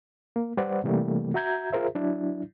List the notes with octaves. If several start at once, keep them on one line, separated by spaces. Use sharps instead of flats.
A#3
G3 B4 C5 D5 F#5
C3 E3 G3 A3 A#3
F#4 E5 A#5 G6 G#6
F4 G#4 A#4 C5 E5
F#3 D4 E4